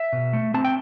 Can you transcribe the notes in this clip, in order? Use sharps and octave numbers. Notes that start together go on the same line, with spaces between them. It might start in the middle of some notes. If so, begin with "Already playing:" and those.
Already playing: E5
B2
A3
C4 A5
G5